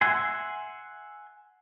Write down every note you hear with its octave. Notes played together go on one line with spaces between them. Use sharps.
E5 F#5 G#5 C6